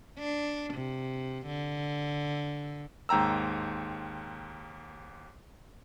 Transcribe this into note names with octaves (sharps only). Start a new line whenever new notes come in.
D4
C3
D3
D#2 G#2 G5 A#5 E6